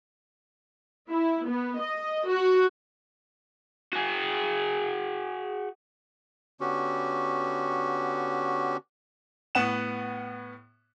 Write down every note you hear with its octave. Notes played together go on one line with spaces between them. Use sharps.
E4
B3
D#5
F#4
F#4 G#4
D3 B3 C#4 F#4 G4
A2 B3 F#5 E7